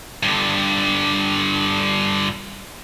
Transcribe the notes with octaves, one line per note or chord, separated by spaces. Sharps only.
G2 D3